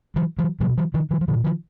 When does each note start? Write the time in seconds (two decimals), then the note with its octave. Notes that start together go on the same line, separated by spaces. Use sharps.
0.16 E3 F#3
0.38 E3 F#3
0.60 B2 F3 G3
0.77 E3 F#3
0.94 D#3 F3
1.11 D#3 F3
1.21 F3
1.28 A#2 D3 E3
1.44 D#3 F3